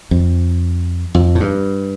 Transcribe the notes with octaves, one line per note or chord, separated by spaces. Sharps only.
F2
F2
A2
G2